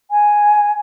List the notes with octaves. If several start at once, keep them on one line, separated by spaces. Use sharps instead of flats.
G#5